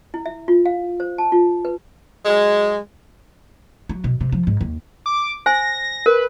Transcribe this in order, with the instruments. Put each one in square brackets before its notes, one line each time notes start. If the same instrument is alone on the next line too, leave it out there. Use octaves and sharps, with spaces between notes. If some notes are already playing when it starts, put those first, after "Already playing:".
[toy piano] E4
E5
F4
F5
C5
A5
F4
B4
[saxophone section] F#3 G#3
[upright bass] F#3
B2
C3
F3
G#2
D#2
[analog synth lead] D6
[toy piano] C5 G#5 [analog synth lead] A#6
[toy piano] A#4 [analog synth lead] B4